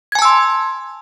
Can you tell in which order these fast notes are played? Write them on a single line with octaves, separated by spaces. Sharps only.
G#6 G#5 A5 E6 C6